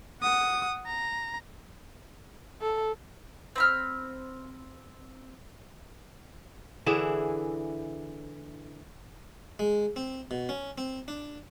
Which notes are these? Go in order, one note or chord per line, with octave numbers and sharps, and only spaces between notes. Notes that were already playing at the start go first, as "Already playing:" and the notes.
F#5 D#6
A#5
A4
C4 B5 F6
D3 E3 E4 G#4
G#3
C4
B2
C#4
C4
D4